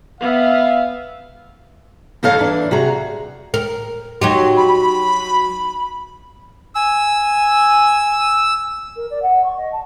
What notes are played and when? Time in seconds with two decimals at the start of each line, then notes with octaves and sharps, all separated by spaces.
0.21 B3 E5 F5
2.23 F2 C#3 D#4 A4 C#5 F5
2.39 E3 D4
2.71 C3 F#4 G#4 A#5
3.54 A#4
4.21 F#3 D#4 G4 C6
4.57 B5
6.75 G#5 E6
8.96 A#4
9.10 D5
9.22 F#5
9.44 C#6
9.57 D#5
9.72 A5